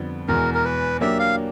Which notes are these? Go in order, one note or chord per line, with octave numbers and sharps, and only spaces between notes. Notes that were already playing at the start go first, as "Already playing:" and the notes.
Already playing: F2 D3 G3 B3
E2 B2 G#3 A#4
A#4
B4
F#3 A#3 D4 G4 A#4 E5
F5